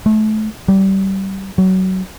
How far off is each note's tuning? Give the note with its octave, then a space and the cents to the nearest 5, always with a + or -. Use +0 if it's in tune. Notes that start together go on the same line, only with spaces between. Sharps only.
A3 -30
G3 -25
F#3 +20